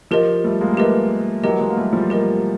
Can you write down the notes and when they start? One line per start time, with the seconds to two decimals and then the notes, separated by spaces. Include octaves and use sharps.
0.11 F3 G4 A#4 D#5
0.44 G3 A3
0.61 G#3 A#3
0.74 A#3
0.77 A3 B3 G4 A#4 D#5
1.43 E3 F#3 G4 A#4 D#5
1.60 F#3 G#3
1.70 A#3
1.77 G3 A3
1.93 F3 G3
2.10 G4 A#4 D#5